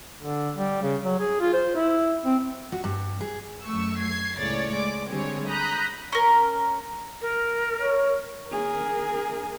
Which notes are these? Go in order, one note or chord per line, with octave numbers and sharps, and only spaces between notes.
D3
G3
C#3
F#3
G#4
F4
C5
E4
C4
F#4
G2
G#4
F#2 A3 C#6 E6
G#6 C7
C#2 A2 C#3 C#5 D5 A6
G#3 D5 D6
D3 G3 G#3 C4 G#4 C#5
A#5 B5 D#6 F#6 G6
C#4 A#4
A#4
C#5
G#4 A#4